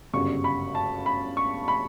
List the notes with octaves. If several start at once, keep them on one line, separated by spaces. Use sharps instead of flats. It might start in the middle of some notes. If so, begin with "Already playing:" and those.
G1 F#2 C#3 G3 C#6
B5
A5
B5
C#6
B5